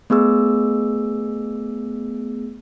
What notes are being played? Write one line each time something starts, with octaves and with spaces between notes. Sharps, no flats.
A3 B3 G#4 E6